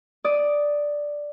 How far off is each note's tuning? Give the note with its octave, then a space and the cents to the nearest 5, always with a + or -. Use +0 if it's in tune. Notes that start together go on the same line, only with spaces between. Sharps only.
D5 +0 D#6 +0